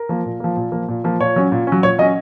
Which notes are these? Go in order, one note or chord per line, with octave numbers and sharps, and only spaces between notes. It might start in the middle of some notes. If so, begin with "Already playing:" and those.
Already playing: A#4
F3 A#3
A#2
F3 A#3
A#2
F3 A#3
A#2
F3 A#3
A#2 C#5
F#3 C#4
A#2
F#3 C#4
A#2 C#5
F#3 C#4 D#5